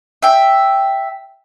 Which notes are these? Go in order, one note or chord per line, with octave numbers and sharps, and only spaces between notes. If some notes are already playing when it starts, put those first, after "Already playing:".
E5 G5